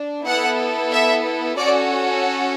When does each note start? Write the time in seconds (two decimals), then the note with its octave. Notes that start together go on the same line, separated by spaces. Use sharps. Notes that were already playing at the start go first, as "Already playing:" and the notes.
Already playing: D4
0.25 B3 E4 A4 F#5
0.91 E5
1.57 C#4 F#4 A4 D5